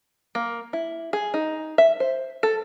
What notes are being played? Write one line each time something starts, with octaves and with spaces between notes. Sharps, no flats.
A#3
E4
G#4
D#4
E5
C5
A4